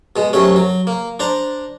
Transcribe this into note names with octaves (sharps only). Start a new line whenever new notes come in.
B2 G#3
F#2 C3 A3 C#4
F#3
A#3
D4 C5 A#5